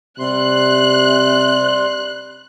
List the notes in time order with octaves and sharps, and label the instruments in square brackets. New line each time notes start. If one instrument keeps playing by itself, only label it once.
[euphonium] C3 [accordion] G3 C6 [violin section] F#6